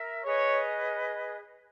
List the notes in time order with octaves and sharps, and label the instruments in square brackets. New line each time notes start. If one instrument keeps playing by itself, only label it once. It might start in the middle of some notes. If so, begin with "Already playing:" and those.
Already playing: [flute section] A#4 E5
[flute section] G#4 B4 D#5 [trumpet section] C#5